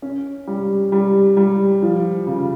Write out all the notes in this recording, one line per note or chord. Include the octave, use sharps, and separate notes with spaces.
C#4
G3
G3
G3
F3
C#3